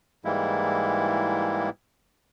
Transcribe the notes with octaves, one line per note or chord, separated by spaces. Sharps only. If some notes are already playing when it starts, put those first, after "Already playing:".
G#2 E3 G3 G#3 A#3 E4